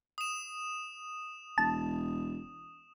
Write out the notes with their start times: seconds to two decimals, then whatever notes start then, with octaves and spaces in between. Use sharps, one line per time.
0.18 D#6 E7
1.58 E1 A5